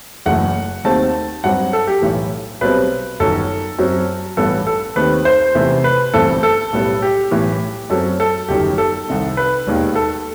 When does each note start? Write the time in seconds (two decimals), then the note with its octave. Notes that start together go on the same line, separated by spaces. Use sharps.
0.26 F#1 F#2 E3 A3 F#5
0.84 D#2 D#3 A3 C4 A5
1.44 G2 F#3 C4 F#5
1.73 A4
1.87 G4
2.02 B1 A2 E3
2.61 B1 B2 G3 C4 B4
3.20 G1 F#2 D#3 F#3 A4
3.79 F#2 F#3 C4
4.37 A1 G2 E3 B3 A4
4.67 A4
4.96 D#2 D#3 A3 C4 B4
5.25 C5
5.55 E2 C3 E3 A3 C4
5.84 B4
6.14 G1 G2 E3 A3 C4 A4
6.43 A4
6.73 B1 A2 G3 B3
7.02 G4
7.31 B1 A2 E3 B3
7.90 F#2 F#3 C4 A4
8.20 A4
8.49 G1 F#2 D#3 G4
8.78 A4
9.08 C2 C3 D#3
9.37 B4
9.66 E1 D#2 D#3
9.96 A4